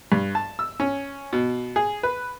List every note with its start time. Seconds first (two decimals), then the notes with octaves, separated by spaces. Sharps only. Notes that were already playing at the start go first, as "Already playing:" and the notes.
0.12 G2
0.35 A5
0.59 E6
0.80 C#4
1.33 B2
1.76 G#4
2.03 B4